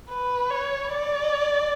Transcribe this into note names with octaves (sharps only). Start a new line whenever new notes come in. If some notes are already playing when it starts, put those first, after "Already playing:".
B4
C#5
D5